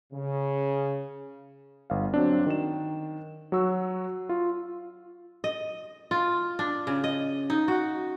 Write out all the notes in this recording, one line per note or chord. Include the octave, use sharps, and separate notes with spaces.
C#3
G1 F5
F#3 C4 D4
D#3 E7
F#3 F#4 C#6 E6
F4
D#5
F4
D4
C#3
D#5
D#4
F#4